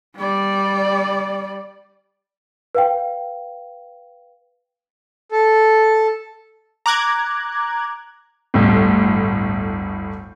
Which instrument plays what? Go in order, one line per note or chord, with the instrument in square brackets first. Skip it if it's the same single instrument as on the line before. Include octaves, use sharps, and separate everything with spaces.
[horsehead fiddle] G3 D5
[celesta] B4 F5 G5
[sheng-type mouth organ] A4
[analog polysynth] A#5 D6 F#6 G#6
[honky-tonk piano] G1 D2 A2